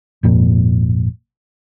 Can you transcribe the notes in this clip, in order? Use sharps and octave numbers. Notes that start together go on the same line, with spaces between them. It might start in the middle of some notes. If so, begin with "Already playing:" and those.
G#1 F2 A#2